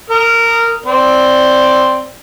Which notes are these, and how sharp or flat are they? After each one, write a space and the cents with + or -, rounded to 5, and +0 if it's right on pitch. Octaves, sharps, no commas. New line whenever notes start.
A#4 -15 D#6 +0
C4 +0 D5 +0